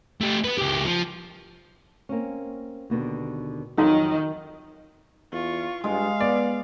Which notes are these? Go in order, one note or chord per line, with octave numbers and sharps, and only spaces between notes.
A3 G4
B3 B4
C#2 G4
F3
A#3 C4 C#4
D#2 B2 D3
F2 D#3 F#3 D#4
E2 F4 C#6
G2 G#3 F5
B3 D5